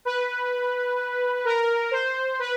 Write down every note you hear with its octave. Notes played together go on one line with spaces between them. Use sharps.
B4
A#4
C5
B4